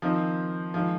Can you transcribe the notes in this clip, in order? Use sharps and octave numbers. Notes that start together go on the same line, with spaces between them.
D#3 F3 C4 D#4
D#3 F3 G#3